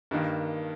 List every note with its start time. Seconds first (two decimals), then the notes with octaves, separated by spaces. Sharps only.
0.11 G2 D#3 A#3